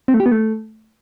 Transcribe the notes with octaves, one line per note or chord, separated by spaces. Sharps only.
C4
A3
G4
B3
A3